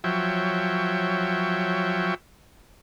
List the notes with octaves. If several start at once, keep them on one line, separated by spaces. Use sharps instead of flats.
F3 F#3 C#5 E5 G5